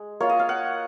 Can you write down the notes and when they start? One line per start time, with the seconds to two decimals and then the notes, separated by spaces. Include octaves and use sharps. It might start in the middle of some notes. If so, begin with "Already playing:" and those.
Already playing: G#3
0.20 A#3 F4 C#5
0.29 D#5
0.39 F5
0.49 F#5